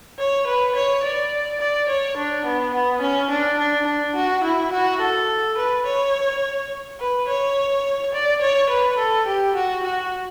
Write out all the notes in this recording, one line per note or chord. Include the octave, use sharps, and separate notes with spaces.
C#5
B4
C#5
D5
D5
C#5
D4
B3
B3
C#4
D4
D4
D4
F#4
E4
F#4
A4
B4
C#5
B4
C#5
D5
C#5
B4
A4
G4
F#4
F#4